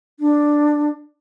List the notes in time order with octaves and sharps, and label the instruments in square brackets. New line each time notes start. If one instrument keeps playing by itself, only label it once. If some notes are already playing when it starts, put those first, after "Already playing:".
[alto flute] D4